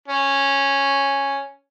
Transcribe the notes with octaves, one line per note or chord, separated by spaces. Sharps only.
C#4